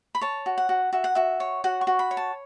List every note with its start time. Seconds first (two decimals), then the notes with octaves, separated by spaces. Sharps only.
0.15 B5
0.21 C#5 A5
0.46 F#4
0.58 F#5
0.69 F#4
0.93 F#4 E5
1.04 F#5
1.15 F#4 E5
1.40 C#5
1.64 F#4 F#5
1.81 C#6
1.87 F#4
1.99 B5
2.11 C#5
2.17 A5